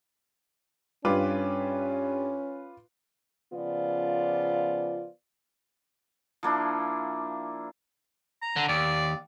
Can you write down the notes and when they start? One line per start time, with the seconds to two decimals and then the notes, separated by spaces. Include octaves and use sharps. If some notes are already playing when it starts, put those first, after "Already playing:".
1.05 G2 C#4 F4 B4 D6
3.53 C#3 F3 B3 F4 D5
6.43 F3 A#3 D4 E4
8.42 A#5
8.56 D3
8.68 D#2 D5